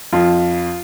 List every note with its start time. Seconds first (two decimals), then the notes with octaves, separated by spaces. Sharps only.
0.13 F2 F4